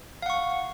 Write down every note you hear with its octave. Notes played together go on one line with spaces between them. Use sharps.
F5 F#5 C#6